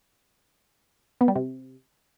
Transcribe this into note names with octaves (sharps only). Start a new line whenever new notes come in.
B3
G3
C3